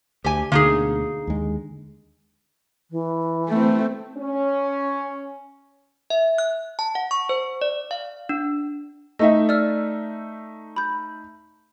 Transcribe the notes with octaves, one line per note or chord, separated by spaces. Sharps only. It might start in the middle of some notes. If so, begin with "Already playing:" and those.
D2 G4 G#5
D2 B2 D3 A#3 D#4 G#4
D#2 G#3
E3
A3 C4
C#4
E5
F#6
A5
F#5
C#6
C5
D5
F5
D4
A3 D#4 D#5 E5
D5 E6 F6
B5 G6